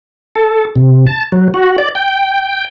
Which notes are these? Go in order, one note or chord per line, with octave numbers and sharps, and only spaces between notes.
A4
C3
A5
F#3
F#4
D5
G5